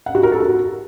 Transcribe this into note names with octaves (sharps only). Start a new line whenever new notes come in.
F#5
F#4
A#4
A4
F#4